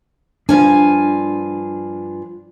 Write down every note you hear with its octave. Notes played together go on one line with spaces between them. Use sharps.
G2 F3 D4 G#5